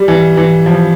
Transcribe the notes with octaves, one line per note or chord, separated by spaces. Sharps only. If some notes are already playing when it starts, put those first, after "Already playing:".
Already playing: G3
E3
E3
F3